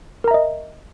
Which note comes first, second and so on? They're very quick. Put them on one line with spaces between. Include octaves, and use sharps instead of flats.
A#4 A#5 E5 D#5